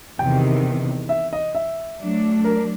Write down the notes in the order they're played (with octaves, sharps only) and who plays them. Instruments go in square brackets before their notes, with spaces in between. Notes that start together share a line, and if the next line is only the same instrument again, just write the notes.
[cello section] E2 C3 D#3 [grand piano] G5
[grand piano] E5
D#5
E5
[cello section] F#3 A3 D4
[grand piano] A#4